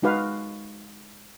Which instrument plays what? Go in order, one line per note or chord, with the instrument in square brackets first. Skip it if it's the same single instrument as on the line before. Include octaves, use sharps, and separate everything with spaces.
[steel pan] G#3 D#4 F#4 B4 F5